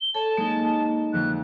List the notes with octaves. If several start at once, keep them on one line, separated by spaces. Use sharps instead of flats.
G7
A4 C#5 A5
G#3 A#3 D#4
F2 D3 F3 F#6